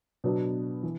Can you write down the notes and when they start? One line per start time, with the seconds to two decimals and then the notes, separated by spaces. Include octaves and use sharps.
0.24 B2 F#3 B3 D4
0.83 E3